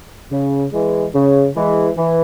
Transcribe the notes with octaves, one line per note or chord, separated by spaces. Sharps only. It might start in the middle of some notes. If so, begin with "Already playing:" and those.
C#3
E3 G#3
C#3
E3 G#3
E3